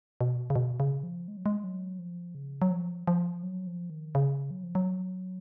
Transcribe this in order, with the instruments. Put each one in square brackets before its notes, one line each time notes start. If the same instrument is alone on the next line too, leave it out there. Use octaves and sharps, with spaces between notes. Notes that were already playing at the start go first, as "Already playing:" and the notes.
[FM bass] B2
C#3
B2
C#3
F3
G#3
F#3
G#3
F#3
F3
C#3
F#3
F3
F3
F#3
F3
D#3
C#3
F#3
F3
F#3